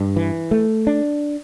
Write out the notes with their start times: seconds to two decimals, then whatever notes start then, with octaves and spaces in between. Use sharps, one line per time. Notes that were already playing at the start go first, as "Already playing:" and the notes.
Already playing: G2
0.16 E3
0.51 A3
0.87 D4